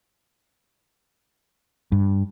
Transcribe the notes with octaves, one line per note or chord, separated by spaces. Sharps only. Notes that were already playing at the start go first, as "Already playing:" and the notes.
G2